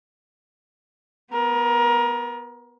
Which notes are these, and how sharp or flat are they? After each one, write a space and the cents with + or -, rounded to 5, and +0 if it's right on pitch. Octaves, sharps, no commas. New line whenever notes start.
B3 +0 A#4 +25